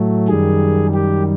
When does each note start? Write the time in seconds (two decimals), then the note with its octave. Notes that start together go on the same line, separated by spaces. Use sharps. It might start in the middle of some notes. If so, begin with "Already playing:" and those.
Already playing: A2 F#3 A3
0.28 F#2 D#3 G3 G#4
0.94 G4